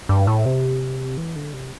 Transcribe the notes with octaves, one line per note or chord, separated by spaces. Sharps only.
G2
A2
C3
E3
D3
C3